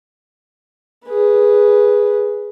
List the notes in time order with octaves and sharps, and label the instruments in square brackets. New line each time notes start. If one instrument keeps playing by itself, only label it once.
[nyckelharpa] G#4 B4